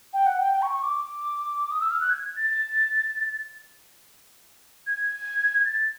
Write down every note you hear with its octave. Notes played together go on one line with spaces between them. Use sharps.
G5
F#5
G5
G5
C#6
C#6
D6
D#6
E6
F6
F#6
G#6
A6
A6
G#6
A6